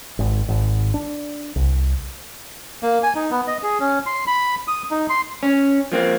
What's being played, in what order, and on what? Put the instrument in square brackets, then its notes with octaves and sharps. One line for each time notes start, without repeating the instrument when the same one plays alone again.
[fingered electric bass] G#1
G#1
D4
C2
[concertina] A#3
G#5
D#4
B3
D#5
G#4
C#4
C6
B5
D#6
D#4
C6
[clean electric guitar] C#4
F3 A#3 C4